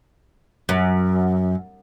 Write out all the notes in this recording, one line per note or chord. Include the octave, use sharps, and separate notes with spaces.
F#2